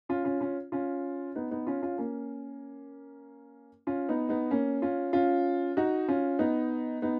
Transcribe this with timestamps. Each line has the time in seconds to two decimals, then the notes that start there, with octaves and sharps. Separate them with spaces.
0.09 C#4 F4
0.25 C#4 F4
0.41 C#4 F4
0.72 C#4 F4
1.35 B3 D#4
1.51 B3 D#4
1.67 C#4 F4
1.82 C#4 F4
1.98 A#3 C#4
3.87 C#4 F4
4.09 B3 D#4
4.29 B3 D#4
4.51 A#3 C#4
4.82 C#4 F4
5.13 C#4 F4
5.77 D#4 F#4
6.08 C#4 F4
6.39 B3 D#4
7.02 B3 D#4